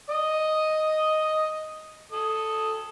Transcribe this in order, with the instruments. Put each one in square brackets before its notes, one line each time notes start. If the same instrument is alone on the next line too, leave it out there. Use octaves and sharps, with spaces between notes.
[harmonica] D#5 D#6
A4 D#6